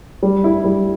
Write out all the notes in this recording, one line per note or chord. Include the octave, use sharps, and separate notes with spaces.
G3
E4
G3